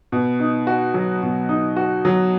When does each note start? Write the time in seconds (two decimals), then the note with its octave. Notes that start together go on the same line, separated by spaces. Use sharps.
0.12 B2
0.40 D#4
0.67 F#4
0.94 F#3
1.23 B2
1.49 D#4
1.76 F#4
2.05 F#3